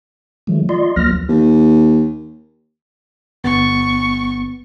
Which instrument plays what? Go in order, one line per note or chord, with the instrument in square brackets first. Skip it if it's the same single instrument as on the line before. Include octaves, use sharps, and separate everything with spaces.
[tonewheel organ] D#3 F3 F#3 G#3 A3
F4 D5 D#5 C6
D2 F3 F#3 A#3 F6 A#6
[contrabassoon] D#2
[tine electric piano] G1 B3 A6 [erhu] C#6